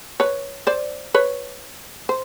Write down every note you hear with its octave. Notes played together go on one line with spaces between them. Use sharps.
B4 C#5
C5 D5
B4 C#5
C5